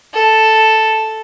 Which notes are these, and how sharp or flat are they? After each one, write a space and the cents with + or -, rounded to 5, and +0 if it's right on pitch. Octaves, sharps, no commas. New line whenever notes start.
A4 +0